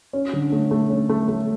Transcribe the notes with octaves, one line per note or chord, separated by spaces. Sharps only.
C#4
D3
A3
A3
C#4
A3
A3